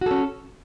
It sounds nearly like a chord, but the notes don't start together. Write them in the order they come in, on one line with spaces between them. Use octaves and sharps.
F#4 A4 C#4